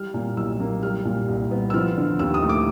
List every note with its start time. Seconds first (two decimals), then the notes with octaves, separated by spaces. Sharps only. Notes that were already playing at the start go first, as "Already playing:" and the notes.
Already playing: G3 F6
0.14 A#2
0.37 B1 E6
0.60 A#3
0.83 G3 F6
1.05 A#2
1.29 C2
1.51 B3
1.70 E6
1.74 F3 F6
1.97 D3
2.19 D#2 E6
2.34 D#6
2.42 A3
2.49 D6